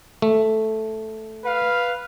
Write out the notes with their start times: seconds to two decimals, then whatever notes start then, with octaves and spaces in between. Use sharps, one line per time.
0.22 A3
1.44 B4 F5